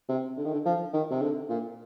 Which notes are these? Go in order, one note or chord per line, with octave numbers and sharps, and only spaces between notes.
C3
D3
D#3
D3
F3
D#3
C3
D3
A#2